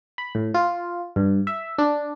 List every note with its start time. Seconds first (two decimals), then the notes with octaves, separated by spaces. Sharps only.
0.18 B5
0.35 A2
0.54 F4
1.16 G2
1.47 E5
1.78 D4